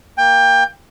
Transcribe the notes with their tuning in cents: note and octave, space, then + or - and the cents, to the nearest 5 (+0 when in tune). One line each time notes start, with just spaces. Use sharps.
A#3 +0 G5 +25